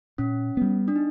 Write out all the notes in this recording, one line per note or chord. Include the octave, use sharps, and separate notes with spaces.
A#2 C#4
G3 B3
D4
D#4